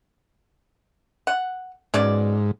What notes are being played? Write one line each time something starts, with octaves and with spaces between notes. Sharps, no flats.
F#5
G#2 B2 C#4 D5